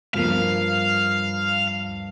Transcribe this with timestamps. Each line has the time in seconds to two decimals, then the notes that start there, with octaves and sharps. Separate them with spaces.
0.14 G2 F3 A#3 F5